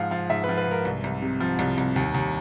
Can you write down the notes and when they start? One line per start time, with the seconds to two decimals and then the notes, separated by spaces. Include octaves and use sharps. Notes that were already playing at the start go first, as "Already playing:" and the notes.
Already playing: G#2 F3 F5 F#5
0.11 F3 F5
0.30 G#2 E5
0.44 F3 B4
0.58 B4
0.67 G#2 A#4
0.85 C2
1.04 C2
1.22 C3
1.40 F3
1.59 C2
1.78 C2
1.96 D#2
2.14 D#2